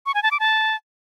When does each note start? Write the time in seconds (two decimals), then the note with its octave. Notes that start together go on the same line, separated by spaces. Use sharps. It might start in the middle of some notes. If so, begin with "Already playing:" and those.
0.06 C#6
0.14 G#5
0.23 A5
0.31 D6
0.40 A5